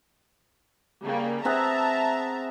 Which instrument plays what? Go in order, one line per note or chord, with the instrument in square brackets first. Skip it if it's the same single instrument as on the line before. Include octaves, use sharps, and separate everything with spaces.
[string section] C#3 G3 A#3
[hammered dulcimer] C4 G#4 F#5 [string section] E5 A5 A#5